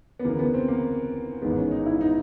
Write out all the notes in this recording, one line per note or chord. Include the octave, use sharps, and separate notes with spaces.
B3
D2 C#3 E3 A#3
B3
C4
A#3
A1 G#2 D#3 G#3 B3
C#4
D#4
E4
D#4